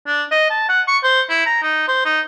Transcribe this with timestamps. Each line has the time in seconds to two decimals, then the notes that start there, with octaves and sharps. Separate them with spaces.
0.07 D4
0.31 D#5
0.50 A5
0.69 F#5
0.88 C#6
1.04 C5
1.30 E4
1.46 A#5
1.63 D#4
1.88 C5
2.05 D#4